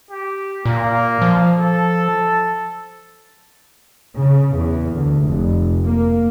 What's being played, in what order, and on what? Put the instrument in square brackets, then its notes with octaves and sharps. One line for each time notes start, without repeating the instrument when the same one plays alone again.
[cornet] G4
[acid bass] A#2 [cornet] A#3
[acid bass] F3
[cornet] A4
[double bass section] C#3
E2
D2
F1
A#3